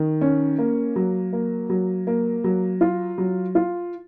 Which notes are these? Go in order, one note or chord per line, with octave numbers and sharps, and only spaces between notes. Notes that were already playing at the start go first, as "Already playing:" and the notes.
Already playing: D#3
C#4
A#3
F#3
A#3
F#3
A#3
F#3
F4
F#3
F4